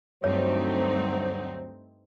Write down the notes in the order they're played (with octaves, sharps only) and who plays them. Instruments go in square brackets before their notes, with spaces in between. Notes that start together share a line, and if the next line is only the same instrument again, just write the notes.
[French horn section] D2 F#3 C5 [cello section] G2 [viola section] A3 C4 D#4 [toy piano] C#5